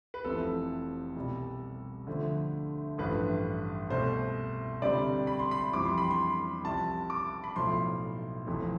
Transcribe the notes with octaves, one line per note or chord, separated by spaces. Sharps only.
B4
F1 F2 C3 E3 A4
C2 B2 G3
D2 D3 F3 A3
A1 G2 F3 A3 B4
C2 B2 A3 C5
D2 C3 G3 D5
B5
C6
B5
F2 E3 G3 D6
C6
B5
C6
C2 C3 F3 A5
D6
B5
B1 A2 F3 A3 C6
F1 F2 E3 A3